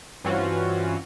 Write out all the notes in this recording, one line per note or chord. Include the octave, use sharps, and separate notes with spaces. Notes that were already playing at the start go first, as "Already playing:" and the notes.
G2 E3 C4 C#4 F4 F#4